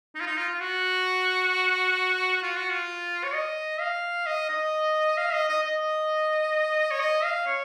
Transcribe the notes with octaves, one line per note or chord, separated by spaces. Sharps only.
D#4
F4
D#4
F4
F4
F#4
F4
F#4
F4
C#5
D#5
F5
D#5
D#5
F5
D#5
D#5
D#5
C#5
D#5
F5
C#5